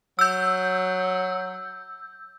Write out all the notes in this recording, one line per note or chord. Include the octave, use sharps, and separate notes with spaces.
F#3 E6 G6